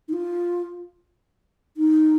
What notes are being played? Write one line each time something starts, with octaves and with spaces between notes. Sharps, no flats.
D#4
F4
D#4